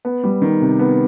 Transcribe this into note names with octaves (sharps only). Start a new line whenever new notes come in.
B3
G3
D#3
C3
B3